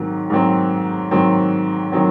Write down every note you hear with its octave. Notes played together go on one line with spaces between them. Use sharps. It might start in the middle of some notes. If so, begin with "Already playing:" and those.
Already playing: G#2 D#3 F#3 C4
G#2 D#3 F#3 C4
G#2 D#3 F#3 C4
D#3 F#3 C4